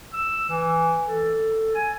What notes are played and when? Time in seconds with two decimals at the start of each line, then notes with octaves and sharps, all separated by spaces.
0.13 E6
0.49 E3
1.07 A4
1.74 G#5